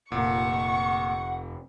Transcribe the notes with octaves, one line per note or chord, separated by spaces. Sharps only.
F1 A#2 F#5 C#6